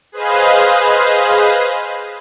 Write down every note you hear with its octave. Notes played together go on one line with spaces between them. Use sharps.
G#4 B4 C5 D#5 F5